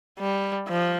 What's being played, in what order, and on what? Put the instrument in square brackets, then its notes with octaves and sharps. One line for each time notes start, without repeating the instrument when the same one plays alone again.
[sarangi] G3
F3